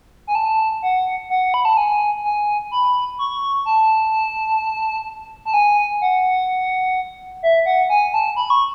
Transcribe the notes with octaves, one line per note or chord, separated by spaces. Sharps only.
G#5
A5
F#5
F#5
B5
A5
G#5
G#5
B5
C#6
A5
A5
G#5
F#5
E5
F#5
G#5
A5
B5
C#6